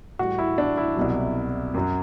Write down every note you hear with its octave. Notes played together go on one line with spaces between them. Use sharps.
A2 G3 F#4
E4
D4
E4
C2 B2 F#3
F#2 F#3